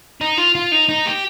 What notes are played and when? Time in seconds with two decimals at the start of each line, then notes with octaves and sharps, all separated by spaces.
0.21 D#4
0.37 F4
0.55 F4
0.72 D#4
0.89 D#4
1.06 G4